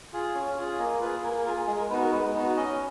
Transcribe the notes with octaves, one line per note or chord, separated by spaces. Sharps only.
F4 G#4
C#4
F4 G#4
A#3 D#5
F4 G#4 B4
A#3 A#4
F4 G#4 A#4
G#4
G#3 G#4
A#4
B3 D#4 F#4 B4
A#4
G#3 B4
B3 D#4 F#4
C#4 D#5